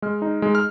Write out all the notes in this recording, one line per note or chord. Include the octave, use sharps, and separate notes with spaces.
G#3 F6
D#4
G#3
F6